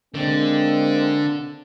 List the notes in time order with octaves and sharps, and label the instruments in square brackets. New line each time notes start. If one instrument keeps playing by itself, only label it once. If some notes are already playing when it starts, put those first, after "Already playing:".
[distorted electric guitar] D3 [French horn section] G#3 A#3 C4